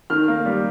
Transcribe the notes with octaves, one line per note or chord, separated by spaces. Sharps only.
D#3 F6
A#3
G3